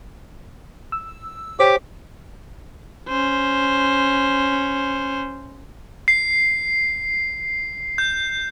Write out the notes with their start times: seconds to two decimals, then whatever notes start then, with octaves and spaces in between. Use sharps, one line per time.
0.92 E6
1.60 G4 C5 C#5 D6 B6
3.09 C#4 C5
6.08 C7
7.98 G6